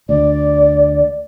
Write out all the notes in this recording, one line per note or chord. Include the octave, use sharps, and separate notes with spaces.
D2 D5